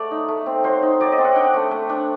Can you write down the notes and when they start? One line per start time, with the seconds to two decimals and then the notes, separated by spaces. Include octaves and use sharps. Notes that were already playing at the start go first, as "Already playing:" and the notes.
Already playing: A3 D5 F#5
0.11 D#4
0.28 A3
0.46 C4
0.64 F#3 C5
0.83 D#4
1.01 F#3 D5
1.12 D#5
1.18 C4
1.25 F#5
1.35 D4 G5
1.54 A3
1.71 A3
1.89 D4